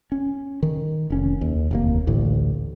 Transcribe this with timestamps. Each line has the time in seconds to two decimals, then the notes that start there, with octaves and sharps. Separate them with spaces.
0.12 C#4
0.63 D#3
1.10 F1 C#4
1.41 D#2
1.71 F1 D#2 A#3
2.07 A1 D2 A2